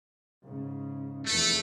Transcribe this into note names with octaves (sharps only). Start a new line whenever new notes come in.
G#2 C#3
F1 E2 A3